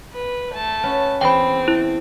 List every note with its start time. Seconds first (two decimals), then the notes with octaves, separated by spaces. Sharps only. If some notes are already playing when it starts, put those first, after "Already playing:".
0.13 B4
0.52 A3 A5
0.83 C#4 F#4 B4
1.21 E2 C4 G5 B5
1.68 E4